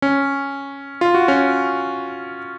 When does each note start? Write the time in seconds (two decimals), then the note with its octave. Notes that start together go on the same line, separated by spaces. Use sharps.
0.02 C#4
1.01 F4
1.14 F#4
1.28 C#4 F4